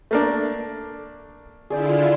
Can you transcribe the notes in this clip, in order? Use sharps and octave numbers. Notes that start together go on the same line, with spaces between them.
A3 A#3 D4
D3 E4 F4 G#4 D5 G5